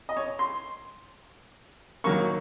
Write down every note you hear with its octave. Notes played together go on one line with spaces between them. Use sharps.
D#5
C#5
C6
D#3 F#3 A#3 C#6